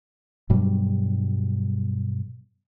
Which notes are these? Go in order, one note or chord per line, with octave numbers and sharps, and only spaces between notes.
G2 B2 F#3 G3